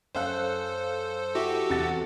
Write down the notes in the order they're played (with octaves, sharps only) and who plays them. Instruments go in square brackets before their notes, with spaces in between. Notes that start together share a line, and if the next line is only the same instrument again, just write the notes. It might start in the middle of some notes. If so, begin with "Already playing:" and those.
[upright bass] F#2 [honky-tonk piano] C#4 F5 F#6 [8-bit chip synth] A4 C5
[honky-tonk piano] E4 [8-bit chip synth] F#4 G4 A4
[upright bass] E2 [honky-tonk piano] C3 F#5 A6